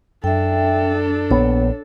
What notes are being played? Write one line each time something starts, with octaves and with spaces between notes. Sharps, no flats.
F#2 D4 A4 E5 G5
A#1 B3 C#5